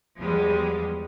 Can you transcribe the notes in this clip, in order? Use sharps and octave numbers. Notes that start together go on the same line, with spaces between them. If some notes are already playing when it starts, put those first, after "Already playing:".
E2 F3 G3 G#3